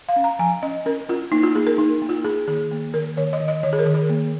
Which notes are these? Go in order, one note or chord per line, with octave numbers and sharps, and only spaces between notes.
F5
C#4
A#5
F3 G#5
C#4 D#5
C#4 A#4
C#4 F4
A#3 D#4
F4
A#3 G#4
A#4
A#3 D#4
A#3
F4
A#3 G#4
D#3 G#4
A#3
D#3 A#4
D#3 C#5
D#5
D#3
D#5
D#3 C#5
G#4
A#4
D#3
G#4
A#3